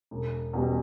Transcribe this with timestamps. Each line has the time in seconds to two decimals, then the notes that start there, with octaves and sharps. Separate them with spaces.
0.11 E1
0.53 E2 B2 G3